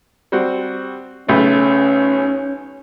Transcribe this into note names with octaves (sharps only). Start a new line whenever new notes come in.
G3 C4 F#4
B1 C#3 A3 C#4